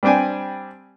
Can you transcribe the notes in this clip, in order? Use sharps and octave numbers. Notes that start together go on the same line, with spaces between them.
G3 C4 D4 G5 G#5